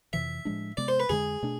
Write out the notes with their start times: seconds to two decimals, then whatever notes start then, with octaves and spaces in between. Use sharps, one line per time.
0.13 F2 C3 E3 E5
0.45 A2 F3 G#3 D4
0.77 C3 G#3 B3 D5
0.88 C5
1.00 B4
1.09 F2 D3 G#3 G#4
1.43 B2 A3 D4